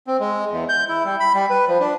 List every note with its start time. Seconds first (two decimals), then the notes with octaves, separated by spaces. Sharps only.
0.07 C4
0.20 G#3
0.51 E2
0.69 G6
0.89 E4
1.05 G3
1.20 B5
1.34 G3
1.50 B4
1.67 F3
1.80 D4